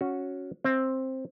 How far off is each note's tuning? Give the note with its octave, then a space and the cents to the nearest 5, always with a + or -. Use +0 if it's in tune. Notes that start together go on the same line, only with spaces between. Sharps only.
C#4 +0 F#4 -10
C4 +10 E5 +0